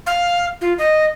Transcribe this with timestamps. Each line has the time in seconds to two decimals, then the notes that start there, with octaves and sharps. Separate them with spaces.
0.07 F5
0.61 F4
0.78 D#5